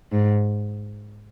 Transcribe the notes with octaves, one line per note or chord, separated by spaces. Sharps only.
G#2